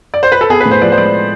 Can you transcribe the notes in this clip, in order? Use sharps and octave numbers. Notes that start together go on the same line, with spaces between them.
D5
C5
B4
A4
B3 G#4
B4
A2
C5
F3 D5
C5
G#3 D5